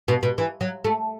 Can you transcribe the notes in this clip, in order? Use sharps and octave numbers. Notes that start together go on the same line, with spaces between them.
B2
B2
E3
F#3
A3